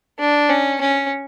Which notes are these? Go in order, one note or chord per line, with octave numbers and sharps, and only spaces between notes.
D4
C#4
C#4